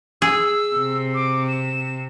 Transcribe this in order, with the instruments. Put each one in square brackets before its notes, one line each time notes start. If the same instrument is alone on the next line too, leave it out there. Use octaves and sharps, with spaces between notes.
[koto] G#4 [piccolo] E6
[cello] C3
[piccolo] D6
E7